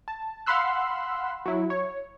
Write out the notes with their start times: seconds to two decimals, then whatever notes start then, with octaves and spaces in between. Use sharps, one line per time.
0.08 A5
0.46 F5 F#5 B5 C6 E6 F#6
1.46 F#3 E4
1.70 C#5